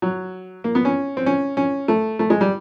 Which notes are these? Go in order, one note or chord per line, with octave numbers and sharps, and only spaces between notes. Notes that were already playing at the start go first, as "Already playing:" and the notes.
F#3
A#3
B3
C#4
C4
C#4
C#4
A3
A3
G#3
G3